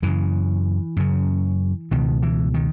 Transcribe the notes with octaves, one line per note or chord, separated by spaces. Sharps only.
F#2 C#3 E3
F#2 C#3
C#2 B2 D#3
E3
D#3